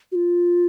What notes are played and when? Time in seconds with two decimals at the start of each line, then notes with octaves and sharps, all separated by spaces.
0.12 F#4
0.15 F4